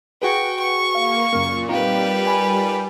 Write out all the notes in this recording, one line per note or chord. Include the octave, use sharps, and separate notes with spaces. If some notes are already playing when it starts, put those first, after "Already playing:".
F#4 G#4 B4 G5 C#6
C#6
A#3 F5
F#2 A#2 C#3 A#3
G3 C4 D#4 F4 G4 A#4 B4 F5
G#5 B5